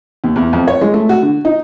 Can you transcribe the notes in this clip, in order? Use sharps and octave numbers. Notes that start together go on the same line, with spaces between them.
D#2
E2
F2
C#5
G#3
A3
F#4
D3
D#4